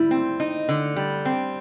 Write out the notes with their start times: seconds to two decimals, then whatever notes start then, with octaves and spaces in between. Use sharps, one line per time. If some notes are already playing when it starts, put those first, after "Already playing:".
Already playing: G3 E4
0.11 C4
0.40 D#4
0.69 D3
0.96 G3
1.25 C4